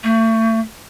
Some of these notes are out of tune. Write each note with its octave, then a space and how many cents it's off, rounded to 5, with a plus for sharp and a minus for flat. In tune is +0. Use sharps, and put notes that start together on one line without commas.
A3 +35